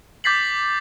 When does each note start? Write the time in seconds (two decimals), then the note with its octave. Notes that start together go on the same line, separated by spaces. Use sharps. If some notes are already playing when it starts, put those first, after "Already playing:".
0.24 D6 G6 A6 B6 C7 F#7